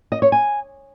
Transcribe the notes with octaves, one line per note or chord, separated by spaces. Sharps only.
D#5
C#5
G#5